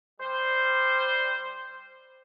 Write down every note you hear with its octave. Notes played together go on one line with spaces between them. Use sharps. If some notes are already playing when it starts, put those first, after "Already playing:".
G3 C5